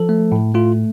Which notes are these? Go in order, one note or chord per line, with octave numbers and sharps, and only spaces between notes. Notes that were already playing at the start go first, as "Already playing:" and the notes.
Already playing: F3 A4
A3
A2
A3 F4